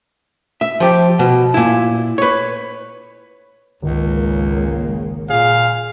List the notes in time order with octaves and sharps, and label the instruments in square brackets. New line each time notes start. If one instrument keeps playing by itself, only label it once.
[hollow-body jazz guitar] E5
F3 G4
B2
A#2 E4
B4 C#5
[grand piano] G#1 [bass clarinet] C#2 [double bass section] C#3 G#3 A#3
[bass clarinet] A#2 [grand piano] G#4 [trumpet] F5